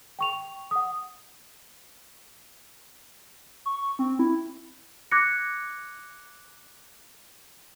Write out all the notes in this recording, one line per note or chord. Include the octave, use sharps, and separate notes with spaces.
G5 C#6 F7
F#5 D#6
C#6
C4
E4
D6 F#6 G#6 A#6 C#7